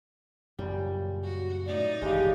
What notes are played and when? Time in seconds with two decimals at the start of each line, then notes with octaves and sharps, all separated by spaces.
0.59 F#2 A#2 C#3 G3
1.23 F#4
1.66 A2 D#4 D5
2.02 G#1 F#2 C#3 E3 G#3 G4